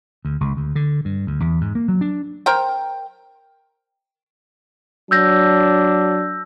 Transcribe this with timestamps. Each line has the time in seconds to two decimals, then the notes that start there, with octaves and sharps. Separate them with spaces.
0.25 D2
0.41 C#2
0.57 D2
0.75 D3
1.05 G2
1.27 D2
1.40 E2
1.61 G#2
1.75 A#3
1.88 F#3
2.01 D4
2.46 A#4 C5 G5
5.11 F#3 D4 E6 G6 A#6